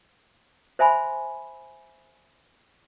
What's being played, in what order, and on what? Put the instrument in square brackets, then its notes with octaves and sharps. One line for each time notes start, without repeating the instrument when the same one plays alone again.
[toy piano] C5 E5 G#5 B5 C6